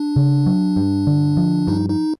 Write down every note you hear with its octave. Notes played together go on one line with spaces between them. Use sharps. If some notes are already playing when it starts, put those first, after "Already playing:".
Already playing: D4
C#3
F#3
G2
D3
F3
G2 D#4
D#4